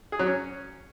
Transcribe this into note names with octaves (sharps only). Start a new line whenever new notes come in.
G#4
F#3
C#4